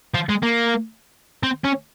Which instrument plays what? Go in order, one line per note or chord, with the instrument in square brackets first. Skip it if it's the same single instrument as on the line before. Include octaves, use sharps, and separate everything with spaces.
[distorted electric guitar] F3
G#3
A#3
C4
C#4